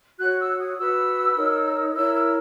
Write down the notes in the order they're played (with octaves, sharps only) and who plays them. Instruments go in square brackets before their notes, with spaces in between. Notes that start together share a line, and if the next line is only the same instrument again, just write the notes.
[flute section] F#4 C#5 F#6
E6
D#6
F#4 B4 E6
D#4 A#4 C#5
E4 A#4 C#5 E6
E6